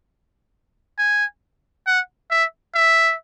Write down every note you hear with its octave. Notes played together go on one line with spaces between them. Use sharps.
G#5
F#5
E5
E5